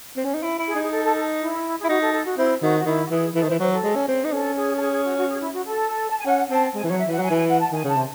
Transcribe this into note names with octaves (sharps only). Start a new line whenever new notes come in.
C4
C#4
D#4
E4
E4
G#4
D#4
G#4
A4
A4
A4
E4
G#4
E4
D#4 F#4
A4
A4
F#4
C4 E4
D#3 F#4
F#4
D#3 E4
F#4
E3 G#4
E3 A4
D#3
C5
E3
F#3 C5
A4
G#3
C#4
C4
D#4 C5
C#4 A4
G#4
A4
G#4
G#4
F#4
F#4
G#4
E4
F#4
A4
A5
G#5
C#4 F#5
C4 A5
G#3 G#5
E3
C#5
F#3
E5
E3 F#5
F#3 G#5
E3
G#5
F#5
A5
D#3 G#5
C#3
A5
C3